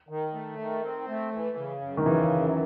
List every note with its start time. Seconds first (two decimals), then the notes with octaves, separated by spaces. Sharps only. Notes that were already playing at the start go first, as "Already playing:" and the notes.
0.09 D#3
0.34 A3
0.59 D#3
0.83 C4
1.08 A3
1.33 E3
1.57 C#3
1.82 F#2
1.97 D#3
2.06 C#3 E3
2.31 F#2